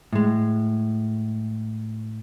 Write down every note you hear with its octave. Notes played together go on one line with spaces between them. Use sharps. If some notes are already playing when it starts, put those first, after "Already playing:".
A2 G#3